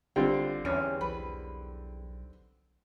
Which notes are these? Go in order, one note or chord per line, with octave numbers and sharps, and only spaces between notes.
G1 D3 G3 C4 F4
E2 E3 C#4
B1 B4